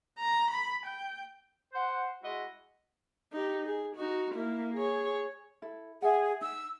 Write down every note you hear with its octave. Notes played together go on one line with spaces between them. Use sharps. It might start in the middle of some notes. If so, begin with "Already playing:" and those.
A#5
B5
G5
C5 F#5
G#3 E4 F#4 D#5
D#4 G4
G#4
D#4 F#4
A#3 E4
G#4 C#5
E4 A4
G#4 E5 F#5
D#4 E6